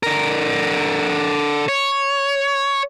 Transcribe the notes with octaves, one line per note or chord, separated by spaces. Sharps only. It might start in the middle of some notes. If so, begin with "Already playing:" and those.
D3 A#4
C#5